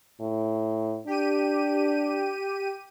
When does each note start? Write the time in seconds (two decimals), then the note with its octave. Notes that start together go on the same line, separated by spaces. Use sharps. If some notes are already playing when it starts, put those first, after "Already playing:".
0.20 A2
1.07 D4 G4 D#7